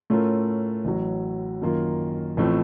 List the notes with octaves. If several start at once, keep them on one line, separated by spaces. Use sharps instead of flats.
A2 A3 C#4 F4 A#4
A1 A2 F#3
F#2 D#3 A#3 F4 A#4
A1 A2 F3 A3 C4